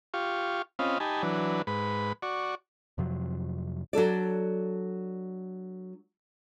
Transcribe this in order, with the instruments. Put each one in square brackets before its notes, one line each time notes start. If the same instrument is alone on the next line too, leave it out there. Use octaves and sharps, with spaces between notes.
[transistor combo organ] F4 G4 F5 C#6
C4 C#4 F4 D#5 F5 B5
D#4 G4 G#5 A5 B5
E3 F#3 D4 B4
G#2 B4 B5
F#4 D5 C#6
[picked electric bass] F2 C3 F3 F#3
[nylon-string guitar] F#3 D4 A4 D5